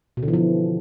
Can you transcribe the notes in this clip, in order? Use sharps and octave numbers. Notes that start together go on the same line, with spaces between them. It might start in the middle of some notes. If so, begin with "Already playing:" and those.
B2
D3
E3
F3